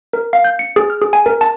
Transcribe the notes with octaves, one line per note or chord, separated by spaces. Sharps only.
A#4
F5
G6
C#7
G#4
F6
G#4
G#5
A#4
A5